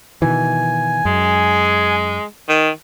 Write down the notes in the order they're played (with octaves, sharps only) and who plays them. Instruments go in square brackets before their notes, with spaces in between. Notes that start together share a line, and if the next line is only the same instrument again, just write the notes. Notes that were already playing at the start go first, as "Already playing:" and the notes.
[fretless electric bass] B2 D#3 E3 [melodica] G#5
[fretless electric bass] F#2 [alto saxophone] G#3
[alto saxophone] D#3